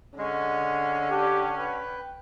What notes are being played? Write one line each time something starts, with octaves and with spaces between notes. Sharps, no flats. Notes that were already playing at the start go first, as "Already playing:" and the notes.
D3 G#3 C#4
D4 G4
B4 G5